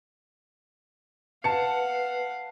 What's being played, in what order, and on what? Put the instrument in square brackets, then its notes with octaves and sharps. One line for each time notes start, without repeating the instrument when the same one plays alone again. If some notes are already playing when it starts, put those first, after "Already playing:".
[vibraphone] B4 [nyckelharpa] F5 F#5 [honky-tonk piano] A5 C#7